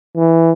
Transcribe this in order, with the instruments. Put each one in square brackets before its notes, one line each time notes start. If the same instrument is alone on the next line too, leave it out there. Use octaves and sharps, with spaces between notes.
[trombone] E3